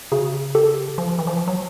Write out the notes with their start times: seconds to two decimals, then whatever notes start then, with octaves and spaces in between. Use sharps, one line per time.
0.12 C#3 F#4 G#4
0.55 G4 A4
0.98 F3
1.19 E3
1.27 F3
1.48 F#3